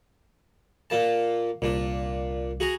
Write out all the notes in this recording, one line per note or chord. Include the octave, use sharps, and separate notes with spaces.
A#2 A#3 A5
C2 A#2 D4
F#4 G#4 A#5